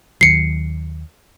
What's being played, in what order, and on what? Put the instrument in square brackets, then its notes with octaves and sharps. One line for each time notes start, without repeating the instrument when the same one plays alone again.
[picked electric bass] D#2 D#3 F#3 [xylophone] C7 C#7